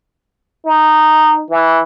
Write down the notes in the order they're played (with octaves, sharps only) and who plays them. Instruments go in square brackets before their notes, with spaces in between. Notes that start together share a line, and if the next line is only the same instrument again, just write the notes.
[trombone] D#4
E3